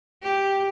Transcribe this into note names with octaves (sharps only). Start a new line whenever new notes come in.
G4